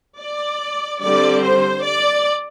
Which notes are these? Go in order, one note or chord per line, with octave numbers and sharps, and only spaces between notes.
D5
D3 G3 C4 D5
C5
D5